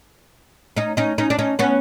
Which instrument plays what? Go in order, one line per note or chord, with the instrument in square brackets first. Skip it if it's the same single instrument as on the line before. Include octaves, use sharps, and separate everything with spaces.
[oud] C#4 D#4
C#4 D#4
C#4 D#4
D4
C#4 D#4
B3 C#4